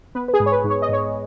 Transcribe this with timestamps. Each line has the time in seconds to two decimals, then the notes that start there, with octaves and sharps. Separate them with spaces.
0.15 B3 B4
0.28 B4
0.34 G#4
0.40 G#2
0.46 C#5
0.52 B4
0.64 G#2
0.70 C#5
0.82 D#5
0.89 G#2 C#5